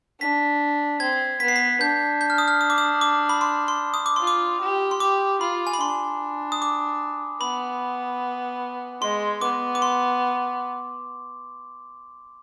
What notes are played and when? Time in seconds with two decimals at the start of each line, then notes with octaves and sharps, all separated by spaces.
0.20 D4 B6
1.00 C4 G#6
1.40 B3 B6
1.48 C7
1.56 B6
1.81 D4 G6
2.21 G6
2.30 F6
2.38 D#6
2.48 F6
2.61 D#6
2.70 D6
2.78 D#6
3.01 D6
3.29 B5
3.41 C6
3.68 C6
3.94 D#6
4.06 D6
4.16 F4 C6
4.27 D6
4.61 G4
4.91 C6
5.00 G4 D6
5.41 F4 B5
5.67 G#5
5.73 B5
5.81 D4 C6
6.52 D#6
6.62 D6
7.41 B3 B5
9.02 G#3 C6
9.41 B3 D6
9.75 D6
9.82 C6